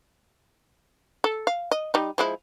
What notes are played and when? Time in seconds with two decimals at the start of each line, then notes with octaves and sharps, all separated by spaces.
1.24 A4
1.47 F5
1.71 D#5
1.94 G3 D#4
2.18 F3 G#3 E4